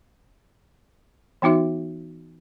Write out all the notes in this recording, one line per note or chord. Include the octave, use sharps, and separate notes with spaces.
E3 B3 D#4 F#4 E5